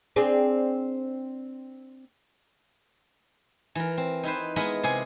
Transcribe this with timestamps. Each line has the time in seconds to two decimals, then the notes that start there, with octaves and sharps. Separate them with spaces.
0.16 C4 D4 G#4
3.75 E3 A#4
3.97 C4
4.23 D#4 E4 B4 C5
4.56 G#3 B3 E4 A#4 D#5 B5
4.83 C3 G#4 G#5